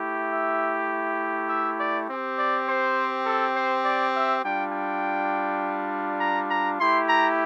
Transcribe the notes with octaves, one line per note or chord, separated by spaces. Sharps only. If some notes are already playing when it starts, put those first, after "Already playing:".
Already playing: A3 E4 G4
E5
E5
D5
C4 G4
D5
C5
A4
C5
D5
E5
G3 D4 F4 G5
G5
A#5
A#5
A3 E4 G4 C6
A#5